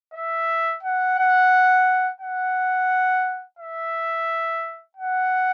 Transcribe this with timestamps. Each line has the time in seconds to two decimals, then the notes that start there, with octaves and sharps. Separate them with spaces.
0.14 E5
0.83 F#5
1.18 F#5
2.20 F#5
3.59 E5
4.97 F#5